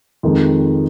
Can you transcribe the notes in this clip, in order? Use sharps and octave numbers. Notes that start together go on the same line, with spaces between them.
F2 D#3 G#3